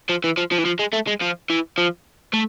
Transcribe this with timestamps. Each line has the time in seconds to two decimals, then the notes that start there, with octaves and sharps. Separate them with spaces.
0.09 F3
0.24 E3
0.38 F3
0.52 F3
0.59 E3
0.66 F3
0.79 G#3
0.93 A3
1.07 G#3
1.21 F3
1.50 E3
1.78 F3
2.33 A3